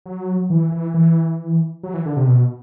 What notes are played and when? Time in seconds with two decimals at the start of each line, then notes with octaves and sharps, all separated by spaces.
0.06 F#3
0.50 E3
0.72 E3
0.94 E3
1.83 F#3
1.94 E3
2.06 D3
2.17 C3
2.27 B2